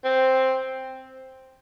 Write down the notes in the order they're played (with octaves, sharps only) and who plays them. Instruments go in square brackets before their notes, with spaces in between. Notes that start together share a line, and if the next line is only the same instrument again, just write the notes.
[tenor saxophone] C4